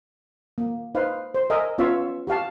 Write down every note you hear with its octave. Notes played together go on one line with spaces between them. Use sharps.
A#3
D#4 B4 C5 F5
C5
A#4 D#5 E5 G#5
B3 C#4 F4 C#5 E5
F#4 G4 F5 A5